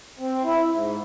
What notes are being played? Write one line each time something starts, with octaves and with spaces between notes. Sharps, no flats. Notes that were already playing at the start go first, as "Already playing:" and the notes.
C4
E4
G#2